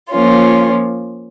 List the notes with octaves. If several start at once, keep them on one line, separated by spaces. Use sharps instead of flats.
F3 A#3 C#4 F4